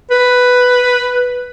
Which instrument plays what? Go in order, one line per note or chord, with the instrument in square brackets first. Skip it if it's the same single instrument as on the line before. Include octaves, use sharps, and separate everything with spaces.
[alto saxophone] B4